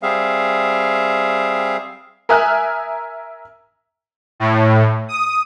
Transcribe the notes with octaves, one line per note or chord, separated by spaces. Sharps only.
G3 C4 G#4 E5 F5
A#4 E5 G#5 D#6 F6 F#6
A2
D#6